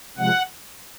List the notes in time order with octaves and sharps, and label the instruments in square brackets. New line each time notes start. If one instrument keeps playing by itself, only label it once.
[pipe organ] C3 F3 G#3 F#5